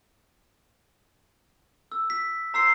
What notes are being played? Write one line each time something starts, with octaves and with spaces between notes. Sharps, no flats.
E6
B6
C5 A#5 E6 C7